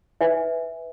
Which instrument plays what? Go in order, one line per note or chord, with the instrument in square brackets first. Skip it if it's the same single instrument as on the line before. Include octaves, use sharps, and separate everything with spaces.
[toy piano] B4 E5 G#5